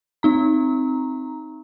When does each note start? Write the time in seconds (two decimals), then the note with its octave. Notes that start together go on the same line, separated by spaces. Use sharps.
0.23 C4 D#4 A#5